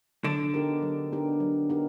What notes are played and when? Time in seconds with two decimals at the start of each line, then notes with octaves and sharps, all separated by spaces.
0.24 D3 F#3 D4
0.54 B3 D#4 G4 A#4
0.82 F#3
1.12 B3 D#4 G4 A#4
1.40 F#3
1.69 B3 D#4 G4 A#4